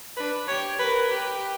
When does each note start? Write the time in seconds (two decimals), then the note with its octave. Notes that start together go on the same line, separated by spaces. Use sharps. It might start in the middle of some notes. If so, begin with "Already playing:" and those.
0.17 D4 B4
0.48 G4 C#5
0.79 A#4 B4
1.11 G4 B4